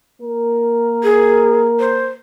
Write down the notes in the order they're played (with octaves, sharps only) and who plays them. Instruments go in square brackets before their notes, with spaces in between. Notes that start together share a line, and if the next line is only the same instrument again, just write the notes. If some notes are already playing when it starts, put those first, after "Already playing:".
[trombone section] A#3 A#4
[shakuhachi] G#4
C5